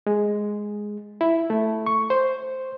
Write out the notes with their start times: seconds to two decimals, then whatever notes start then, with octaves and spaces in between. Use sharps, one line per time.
0.07 G#3
1.21 E4
1.50 A3
1.86 C#6
2.10 C5